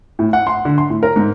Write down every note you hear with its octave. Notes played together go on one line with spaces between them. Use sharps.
A2
F#5
C6
D3
C6
A2
A#4
G#2